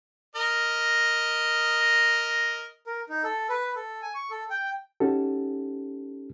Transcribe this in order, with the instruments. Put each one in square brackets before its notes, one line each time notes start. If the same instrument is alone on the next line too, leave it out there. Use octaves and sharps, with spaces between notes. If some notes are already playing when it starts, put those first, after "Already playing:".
[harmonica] A#4 D#5
[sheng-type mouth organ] A#4
D#4
A4
B4
A4
G#5
C#6
A4
G5
[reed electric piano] C#4 D#4 F#4 G4 A4